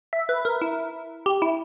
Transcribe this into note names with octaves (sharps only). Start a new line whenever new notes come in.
E5
B4
A#4
E4
G4
E4